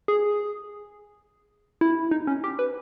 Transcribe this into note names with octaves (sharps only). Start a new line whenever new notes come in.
G#4
E4
D#4
C#4
G4
B4